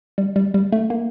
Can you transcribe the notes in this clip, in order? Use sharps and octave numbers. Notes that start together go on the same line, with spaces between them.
G3
G3
G3
A3
A#3